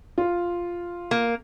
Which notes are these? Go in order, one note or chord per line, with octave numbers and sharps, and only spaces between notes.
F4
A#3